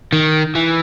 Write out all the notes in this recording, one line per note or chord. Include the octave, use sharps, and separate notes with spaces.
D#3
E3